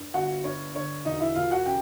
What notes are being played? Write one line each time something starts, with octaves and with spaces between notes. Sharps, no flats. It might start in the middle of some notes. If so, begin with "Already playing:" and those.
Already playing: G2
G1 F#4 F#5
G2 C#5
D3 C#5
E1 D#4 D#5
E4 E5
E1 F4 F5
F#4 F#5
C#3 G4 G5